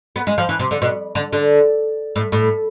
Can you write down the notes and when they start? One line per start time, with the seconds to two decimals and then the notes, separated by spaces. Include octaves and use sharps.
0.16 B3
0.27 G#3
0.38 F3
0.49 E3
0.59 C3
0.71 D3
0.82 B2
1.15 D3
1.33 D3
2.16 A2
2.32 A2